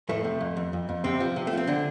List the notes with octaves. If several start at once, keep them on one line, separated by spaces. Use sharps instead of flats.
F2 A2 A3
C3
F2
F2
F2
F2
D2 C3 C4
F3
C3
A3
F3 C4
D3 D4